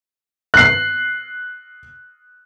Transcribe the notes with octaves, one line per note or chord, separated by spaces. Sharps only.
F#6 C7